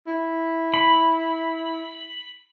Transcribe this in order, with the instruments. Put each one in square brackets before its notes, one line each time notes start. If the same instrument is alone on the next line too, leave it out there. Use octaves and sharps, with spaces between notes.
[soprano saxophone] E4
[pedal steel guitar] B5